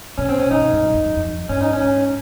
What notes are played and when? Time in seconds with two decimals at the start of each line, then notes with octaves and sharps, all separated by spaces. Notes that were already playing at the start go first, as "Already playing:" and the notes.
0.18 C3 C#4
0.29 C4
0.39 C#4
0.51 C3 D#4
0.61 C3
0.73 G#2
0.83 F#2
0.94 F2
1.06 F#2
1.16 F2
1.49 G#2 C#4
1.61 D#4
1.73 C#4
1.82 G#2